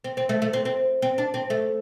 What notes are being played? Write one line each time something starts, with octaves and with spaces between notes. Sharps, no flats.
C4
C4
A3
A3
C4
C4
C4
D4
C4
A3